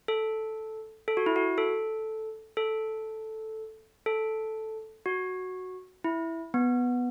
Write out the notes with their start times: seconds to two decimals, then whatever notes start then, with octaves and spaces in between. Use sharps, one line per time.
0.08 A4
1.08 A4
1.17 F#4
1.26 E4
1.36 F#4
1.58 A4
2.57 A4
4.06 A4
5.06 F#4
6.04 E4
6.54 B3